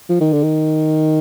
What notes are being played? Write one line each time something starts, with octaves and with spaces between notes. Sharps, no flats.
F3
D#3
D3
D#3